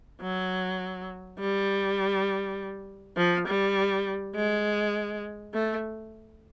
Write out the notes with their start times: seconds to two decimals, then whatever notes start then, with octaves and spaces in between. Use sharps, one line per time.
0.22 F#3
1.40 G3
3.17 F3
3.47 G3
4.35 G#3
5.54 A3